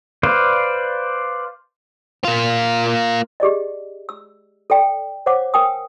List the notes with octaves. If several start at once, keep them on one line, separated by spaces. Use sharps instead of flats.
B4 C5 D5 F5
A#3 F4
G4 G#4 D5 D#5
E6
A4 D5 G5
C5 C#5 F5 F#5 D6
A#4 G5 G#5 D#6